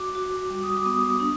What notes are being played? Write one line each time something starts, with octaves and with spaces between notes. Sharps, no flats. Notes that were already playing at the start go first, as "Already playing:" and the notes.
Already playing: F#4 D6
F#4
G3
D#6
D6
B3 D#6
D4